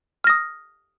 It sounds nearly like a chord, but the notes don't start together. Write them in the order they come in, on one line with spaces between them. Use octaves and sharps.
F6 A#6 D#6